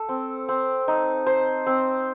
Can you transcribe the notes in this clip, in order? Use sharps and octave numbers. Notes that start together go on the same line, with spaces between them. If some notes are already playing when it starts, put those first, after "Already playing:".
Already playing: A4
C4
C4
D#4
C5
C4